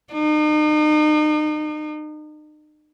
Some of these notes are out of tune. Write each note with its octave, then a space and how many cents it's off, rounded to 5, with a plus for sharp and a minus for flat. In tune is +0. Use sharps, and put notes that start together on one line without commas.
D#4 -40